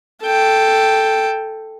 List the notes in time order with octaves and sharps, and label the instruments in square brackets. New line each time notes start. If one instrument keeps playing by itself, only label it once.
[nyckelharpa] A4 G5